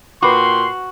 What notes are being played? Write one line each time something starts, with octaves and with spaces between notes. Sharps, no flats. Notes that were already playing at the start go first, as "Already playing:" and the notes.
A#2 F#4 B4 G5 B5 C6 D6